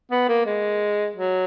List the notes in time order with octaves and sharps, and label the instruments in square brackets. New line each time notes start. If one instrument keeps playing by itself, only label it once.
[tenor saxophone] B3
A#3
G#3
F#3